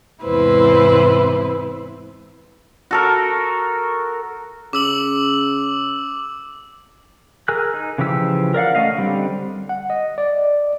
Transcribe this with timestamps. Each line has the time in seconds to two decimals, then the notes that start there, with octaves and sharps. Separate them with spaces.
0.23 E2 G#2 C3 E4 B4 C5
2.91 F#4 A4 A#4
4.73 C#3 D6 E6 F#7
7.48 G#4 A#4 G#5 E6 F#6
7.74 D#4
7.98 C#3 E3 F3 G4 E6
8.54 A#4 D5 F5 F#5
8.75 A3 C#4 D#5 F5
8.98 D3 G3 C4
9.69 F#5
9.90 D#5
10.18 D5